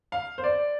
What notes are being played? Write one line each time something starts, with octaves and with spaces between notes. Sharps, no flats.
F5
C5
D5